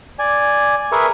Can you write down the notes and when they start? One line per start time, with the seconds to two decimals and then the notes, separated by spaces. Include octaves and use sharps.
0.19 D5 G#5
0.92 G#4 A#4 B4 E5 C#6